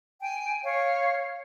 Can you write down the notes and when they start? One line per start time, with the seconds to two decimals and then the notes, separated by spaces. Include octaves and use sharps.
0.22 G5 G#5
0.63 C#5 F5